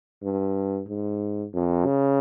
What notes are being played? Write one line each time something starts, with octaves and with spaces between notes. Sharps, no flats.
G2
G#2
F2
C#3